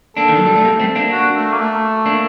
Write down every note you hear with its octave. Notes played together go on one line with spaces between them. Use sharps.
A#3 D4 A4
D#3
F#3
G3
A3
G3 A#3
A3 C4
A#3 D4
F#4
A3
A#3
A3
A#3 D4